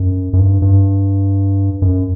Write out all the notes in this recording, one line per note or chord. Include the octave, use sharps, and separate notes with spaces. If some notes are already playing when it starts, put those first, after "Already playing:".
Already playing: F#2
F#2
G2
G2
F#2